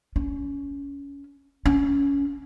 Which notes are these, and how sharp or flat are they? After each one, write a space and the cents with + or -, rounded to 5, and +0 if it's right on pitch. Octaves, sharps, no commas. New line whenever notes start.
C#4 +20
C#4 +20